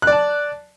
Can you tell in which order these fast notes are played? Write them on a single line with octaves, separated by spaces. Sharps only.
F#6 D5 A5